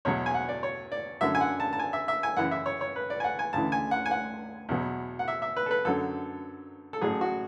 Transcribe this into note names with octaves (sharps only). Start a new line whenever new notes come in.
E2 B2 F#3 C#5
G#5
F#5
D5
C#5
D5
F#2 D3 F#3 E5
G#5
F#5
A5
A5
G#5
E5
E5
G#5
F#2 C#3 E3 F#5
E5
C#5
C#5
B4
D5
G#5
F#5
G#5
D2 C#3 E3 A5
G#5
F#5
G#5
F#5
E2 B2 F#3
F#5
E5
E5
B4
A4
B4
F#2 D3 F#3 A4
A4
A1 A2 F#3 G#4
F#4